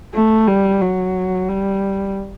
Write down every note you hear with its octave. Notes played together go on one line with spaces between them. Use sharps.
A3
G3
F#3
G3